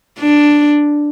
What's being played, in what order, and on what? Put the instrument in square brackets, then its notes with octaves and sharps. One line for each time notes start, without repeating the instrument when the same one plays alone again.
[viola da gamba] D4